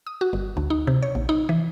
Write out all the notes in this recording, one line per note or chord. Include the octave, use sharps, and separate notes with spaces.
D#6
F#4
G1
D2
D#4
C3
C#5
A#1
D#4
E3